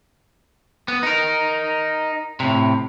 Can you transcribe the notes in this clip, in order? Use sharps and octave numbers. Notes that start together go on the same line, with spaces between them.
B3
D#4 A#4
A2 C3